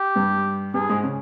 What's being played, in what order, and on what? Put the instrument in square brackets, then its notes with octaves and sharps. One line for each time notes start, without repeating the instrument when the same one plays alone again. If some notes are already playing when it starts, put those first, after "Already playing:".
Already playing: [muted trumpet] G4
[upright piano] G2 G3
[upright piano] G2 G3 [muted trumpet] G#4
[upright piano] G#2 G#3
C#3 C#4